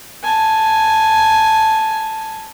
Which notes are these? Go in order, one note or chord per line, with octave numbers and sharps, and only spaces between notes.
G#5 A5